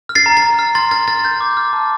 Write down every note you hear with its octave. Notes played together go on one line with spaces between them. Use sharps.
F6
A6 C7
A#5
A6
A#5
F6
C6 A6
F6 A6
F6 A6
F6 G6
D6
F6
A5